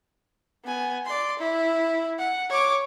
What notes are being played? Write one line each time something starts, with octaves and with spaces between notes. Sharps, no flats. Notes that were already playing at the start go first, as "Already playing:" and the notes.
B3 G#5
D5 C6
E4
F#5
C#5 D6